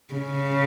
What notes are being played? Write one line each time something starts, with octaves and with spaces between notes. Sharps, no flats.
C#3